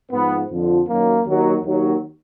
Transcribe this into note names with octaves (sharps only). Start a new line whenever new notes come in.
G#2 F3 B3
F2 D3 F3
F#2 D#3 F#3 A#3
D#2 D#3 F#3
D#2 D#3 F#3